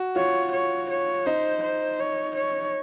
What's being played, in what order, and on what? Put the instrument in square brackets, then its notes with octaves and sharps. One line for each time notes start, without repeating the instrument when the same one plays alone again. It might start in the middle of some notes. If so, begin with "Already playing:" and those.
Already playing: [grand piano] F#4
[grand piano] F4 [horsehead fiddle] C#5
[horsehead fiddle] C#5
C#5
[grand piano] D#4 [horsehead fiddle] C5
[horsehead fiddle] C5
C#5
C#5